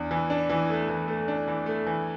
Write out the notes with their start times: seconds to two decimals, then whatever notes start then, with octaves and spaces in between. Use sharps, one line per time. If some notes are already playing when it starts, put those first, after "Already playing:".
Already playing: E2 D4
0.11 E3
0.30 D4
0.49 E3
0.70 A3
0.89 E3
1.08 A3
1.28 D4
1.48 E3
1.66 A3
1.87 E3